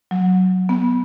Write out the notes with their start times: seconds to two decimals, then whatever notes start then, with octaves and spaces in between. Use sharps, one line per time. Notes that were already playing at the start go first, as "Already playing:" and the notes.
0.11 F#3
0.69 B3